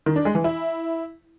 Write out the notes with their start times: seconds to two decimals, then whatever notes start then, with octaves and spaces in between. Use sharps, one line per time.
0.06 D#3
0.16 D4
0.25 G#3
0.35 E3
0.44 E4